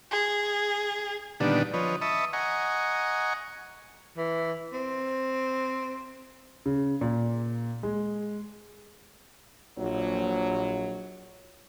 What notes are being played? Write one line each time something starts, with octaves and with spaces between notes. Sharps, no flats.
G#4
A#2 D3 D#3 G3 B3 D4
F3 B4 C#5 D#5
D#5 E5 A5 B5 C#6 D#6
D#5 F#5 G#5 A#5 C#6
E3
C4
C#3
A#2
G#3
A#1 F#3